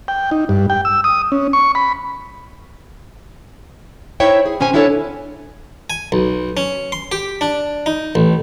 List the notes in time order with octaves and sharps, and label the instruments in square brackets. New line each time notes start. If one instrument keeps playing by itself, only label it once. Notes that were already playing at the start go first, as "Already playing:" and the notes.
[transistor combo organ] G5
D#4
G2
G5
E6
D#6
C#4
C#6
B5
[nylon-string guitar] D#4 E4 C5 C#5 E5 G5
G#4
B2 C#4 C5 G#5
C#4 D4 E4 F#4 A4 C#5
[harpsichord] G#5
B1
C#4
C6
G4
D4
D#4
A1